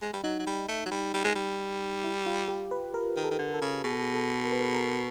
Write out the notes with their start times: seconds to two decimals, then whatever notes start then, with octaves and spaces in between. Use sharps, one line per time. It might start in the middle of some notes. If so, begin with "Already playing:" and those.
0.02 G#3
0.13 G3
0.24 F#3 D#4
0.39 F#3
0.46 G3
0.69 A3
0.86 F#3
0.91 G3
1.14 G3
1.24 G#3
1.35 G3
2.04 E4
2.26 F4
2.48 G4
2.71 B4
2.94 A#4
3.16 D#3
3.24 A4
3.30 D#3
3.39 D3
3.54 A4
3.61 C#3
3.84 B2 G#4
3.92 A4
4.01 G#4
4.14 A4
4.44 A#4
4.52 B4
4.61 A#4
4.74 A#4